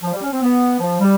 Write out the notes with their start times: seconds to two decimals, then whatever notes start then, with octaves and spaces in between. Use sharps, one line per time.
0.03 F3
0.13 G3
0.22 C#4
0.32 C4
0.42 B3
0.80 F3
1.00 G3